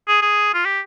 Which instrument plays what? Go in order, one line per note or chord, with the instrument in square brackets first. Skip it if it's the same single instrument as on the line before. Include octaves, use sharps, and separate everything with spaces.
[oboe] G#4
G#4
F4
G4